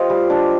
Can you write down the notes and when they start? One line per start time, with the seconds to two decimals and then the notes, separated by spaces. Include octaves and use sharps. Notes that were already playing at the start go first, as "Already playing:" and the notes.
Already playing: F4 G4 C5 D#5 F5
0.10 G3
0.30 D4